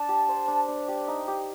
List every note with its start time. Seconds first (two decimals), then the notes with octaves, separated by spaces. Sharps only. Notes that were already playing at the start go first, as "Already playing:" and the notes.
Already playing: D4 A5
0.09 G4
0.28 C5
0.48 D4
0.68 D4
0.88 G4
1.08 D#4
1.28 G4